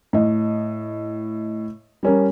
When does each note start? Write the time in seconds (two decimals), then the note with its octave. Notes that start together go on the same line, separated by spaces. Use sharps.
0.13 A2 D#5
2.03 G3 C#4 A#4